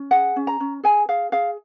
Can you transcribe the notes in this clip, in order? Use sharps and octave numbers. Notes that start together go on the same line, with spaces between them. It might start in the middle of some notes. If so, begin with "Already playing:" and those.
Already playing: C#4
G#4 F#5
C#4
A#5
C#4
G#4 G#5
G#4 F5
G#4 F5